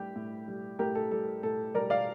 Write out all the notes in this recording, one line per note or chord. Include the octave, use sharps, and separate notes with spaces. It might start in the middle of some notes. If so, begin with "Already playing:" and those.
Already playing: A2 G3 G4
A2
G3
A2 G4 A#4
A4
G3 A4
A2 A4
G3 A#4 D5
D5 F5